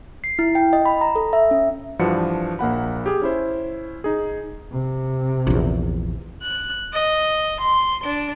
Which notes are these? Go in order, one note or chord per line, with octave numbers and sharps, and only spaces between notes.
C7
E4
G5
D#5
B5
A#5
A4
E5
C#4
G2 E3 F3 D4 F#4 C#7
A#1 A#3 F#5 B5
G4 G#4
C#4 E4 C5
D#4 G#4
C3
A#1 E2
F#6
D#5
C6
D4